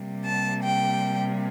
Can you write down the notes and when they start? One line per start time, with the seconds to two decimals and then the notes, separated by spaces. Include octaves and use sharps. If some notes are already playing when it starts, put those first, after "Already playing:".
Already playing: C3 G3 A#3
0.26 A5
0.64 G5